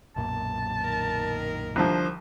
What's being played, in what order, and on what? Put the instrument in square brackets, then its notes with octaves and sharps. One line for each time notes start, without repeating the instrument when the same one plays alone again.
[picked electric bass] B1 F#2 A#2 [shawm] A5
[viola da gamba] D#3 A#4
[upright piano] C2 D3 F3 [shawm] C5